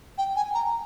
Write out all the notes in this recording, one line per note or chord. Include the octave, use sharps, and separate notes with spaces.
G5
G#5
A#5